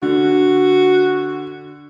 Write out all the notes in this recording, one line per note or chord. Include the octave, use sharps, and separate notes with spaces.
D3 F#4